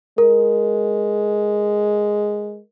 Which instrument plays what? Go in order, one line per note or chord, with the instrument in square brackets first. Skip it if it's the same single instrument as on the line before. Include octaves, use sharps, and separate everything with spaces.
[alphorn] G#3 [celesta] A#4